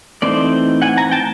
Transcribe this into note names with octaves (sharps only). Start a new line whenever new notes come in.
E3 A3 C4 D#4 C5 D5
F#5 G#5
G#5 A#5
G5 A5